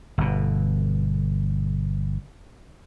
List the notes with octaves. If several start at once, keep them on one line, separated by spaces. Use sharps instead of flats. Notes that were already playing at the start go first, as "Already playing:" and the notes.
G1 B2